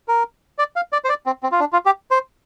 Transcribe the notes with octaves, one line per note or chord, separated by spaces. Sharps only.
A#4
D5
F5
D5
C5
D5
C4
C4
F4
D4
F4
G4
C5